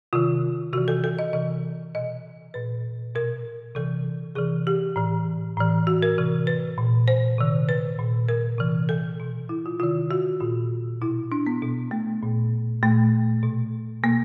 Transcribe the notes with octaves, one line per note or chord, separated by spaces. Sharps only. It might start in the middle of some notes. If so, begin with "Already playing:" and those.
C3 D#3 F4
C3 E3 F#4
A4
A4
D#5
C3 E3 D#5
B2 D#5
A#2 B4
B2 A#4
C3 E3 A4
C3 E3 G#4
G4
A2 E3
A2 E3
F#4
A#4
C3 E3
B4
A#2
C5
C3 D#3
B4
A#2
A#4
C3 E3
A4
B2
E4
F4
C3 D#3 F4
F#4
A#2 F4
B2 E4
D4
B3
B2
A3
A#2
A#2 A3
B2
B2 A#3